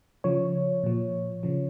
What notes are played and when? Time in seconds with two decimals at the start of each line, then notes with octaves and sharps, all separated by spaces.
0.24 C#3 F3 C#5
0.84 A#2 F3
1.43 C#3 F3